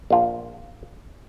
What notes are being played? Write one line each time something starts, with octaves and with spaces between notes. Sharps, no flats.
A#1 F4